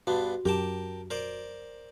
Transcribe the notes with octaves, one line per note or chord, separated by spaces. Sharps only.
G2 B3 D4 F#4
F#2 G4 A#4 G5 A5
A#4 C5 D5